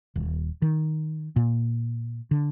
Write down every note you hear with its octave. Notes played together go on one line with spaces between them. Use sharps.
D#1
D#3
A#2
D3